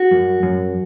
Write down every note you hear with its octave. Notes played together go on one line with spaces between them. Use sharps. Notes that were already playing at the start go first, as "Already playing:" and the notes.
Already playing: F#4
F#2
F#2